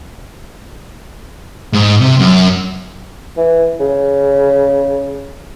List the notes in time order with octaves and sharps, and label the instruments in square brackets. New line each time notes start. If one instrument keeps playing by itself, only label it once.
[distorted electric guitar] G#2
C3
F#2
[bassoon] E3
C#3